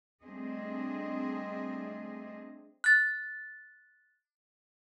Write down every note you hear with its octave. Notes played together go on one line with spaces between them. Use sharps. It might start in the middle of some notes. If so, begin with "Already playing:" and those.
G3 A3 C4 D4 G#4 D#5
F#6 A6